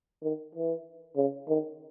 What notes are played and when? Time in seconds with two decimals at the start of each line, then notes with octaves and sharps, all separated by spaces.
0.23 D#3
0.55 E3
1.17 C#3
1.48 D#3